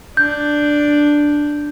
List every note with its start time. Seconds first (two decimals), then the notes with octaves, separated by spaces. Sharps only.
0.17 D4 G6